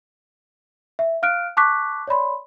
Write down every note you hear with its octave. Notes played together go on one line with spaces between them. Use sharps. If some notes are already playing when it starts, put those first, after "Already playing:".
E5
F5 F6 F#6 D7
A5 C#6 D6 F#6 B6
C#5 D5 B5 C6